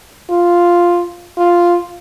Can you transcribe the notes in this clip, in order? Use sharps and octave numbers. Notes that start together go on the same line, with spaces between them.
F4
F4